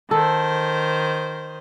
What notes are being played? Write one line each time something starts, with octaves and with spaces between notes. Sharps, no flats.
D#3 A4 C5